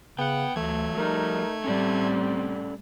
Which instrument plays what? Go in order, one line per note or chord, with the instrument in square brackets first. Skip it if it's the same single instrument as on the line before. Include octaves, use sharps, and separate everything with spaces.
[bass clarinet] C#3 [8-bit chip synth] B3 F#5 [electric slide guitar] G5
[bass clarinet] D2 [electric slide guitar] E3 F#3 [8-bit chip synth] A3 G#6
[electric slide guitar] F3 G3 [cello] D#4 [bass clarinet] A#4
[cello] A2 G3 [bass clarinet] C4 [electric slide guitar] C#4 A4 D5